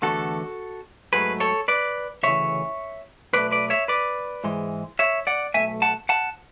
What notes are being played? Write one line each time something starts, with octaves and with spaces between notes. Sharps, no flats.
E2 D3 A3 F#4 A4
G#2 F#3 A3 G#4 B4
A4 C#5
B4 D5
D2 C#3 E3 C#5 E5
B1 B2 A3 B4 D5
B4 D5
C#5 E5
B4 D5
G#2 E3 G#3
C#5 E5
D5 F#5
B1 B2 A3 E5 G#5
F#5 A5
F#5 A5